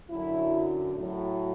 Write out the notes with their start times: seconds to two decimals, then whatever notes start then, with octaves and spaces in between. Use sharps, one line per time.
0.10 F#2 D3 F#3 E4
0.95 A2 F#3